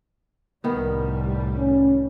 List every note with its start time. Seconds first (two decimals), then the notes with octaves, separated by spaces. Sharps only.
0.64 C2 A2 D#3 G3 B3
1.58 C#4